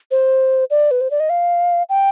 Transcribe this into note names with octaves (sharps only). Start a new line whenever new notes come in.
C5
D5
B4
C5
D5
D#5
F5
G5